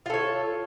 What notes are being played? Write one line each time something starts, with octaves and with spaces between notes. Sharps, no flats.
F4 A4 C#5